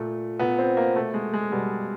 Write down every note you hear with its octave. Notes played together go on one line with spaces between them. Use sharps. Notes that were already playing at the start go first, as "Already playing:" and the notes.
Already playing: A#2 A3
A#2 B3
C4
A#3
B2 A3
G#3
G#3
B2 G3